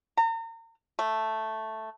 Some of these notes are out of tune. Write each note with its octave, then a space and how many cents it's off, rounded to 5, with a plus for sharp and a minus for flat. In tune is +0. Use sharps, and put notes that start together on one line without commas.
A#5 -40
A3 +0